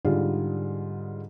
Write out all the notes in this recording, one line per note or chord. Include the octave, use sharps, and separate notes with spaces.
G#2 D3 G3 F4 G#4